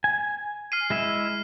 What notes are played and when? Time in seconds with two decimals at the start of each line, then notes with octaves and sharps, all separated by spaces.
0.04 G#5
0.72 F6 C7 D#7
0.90 G#3 E4 E5